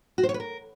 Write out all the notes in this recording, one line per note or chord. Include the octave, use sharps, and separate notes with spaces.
F#4
C5
C#5
B4
A#4